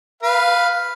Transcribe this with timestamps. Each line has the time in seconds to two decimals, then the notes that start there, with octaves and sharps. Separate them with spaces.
0.23 B4 F5